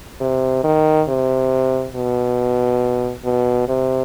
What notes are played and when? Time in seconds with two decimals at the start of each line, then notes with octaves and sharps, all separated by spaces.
0.21 C3
0.64 D#3
1.09 C3
1.96 B2
3.25 B2
3.68 C3